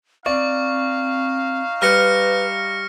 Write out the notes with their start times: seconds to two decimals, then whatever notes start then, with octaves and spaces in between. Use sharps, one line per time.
0.26 C4 D#4 D5 D#5 F5 C#6
1.82 G3 B4 F6 A#6 C#7